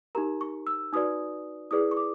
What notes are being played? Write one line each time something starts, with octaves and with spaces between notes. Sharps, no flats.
D#4 G4 A#4 A#5
C#6
E6
D#4 F#4 B4 D5 D#6
E4 G#4 B4 D5 D#6
C#6
D6